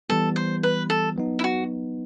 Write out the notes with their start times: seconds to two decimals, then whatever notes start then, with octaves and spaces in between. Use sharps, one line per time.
0.09 E3 G3 B3 A4
0.36 C5
0.63 B4
0.90 A4
1.16 F#3 B3 D#4
1.39 E4
1.44 F#4